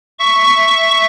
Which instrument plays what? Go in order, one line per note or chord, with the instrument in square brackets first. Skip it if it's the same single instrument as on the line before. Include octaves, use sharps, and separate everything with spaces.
[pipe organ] E5 C#6